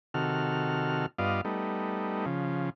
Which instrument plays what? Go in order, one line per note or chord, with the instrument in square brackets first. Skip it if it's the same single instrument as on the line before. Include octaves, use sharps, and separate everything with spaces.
[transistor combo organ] C3 D#3 F#4 A4 F6
G2 B3 F4 D5 D#5 F5
G3 A3 B3 D#4
C#3 F3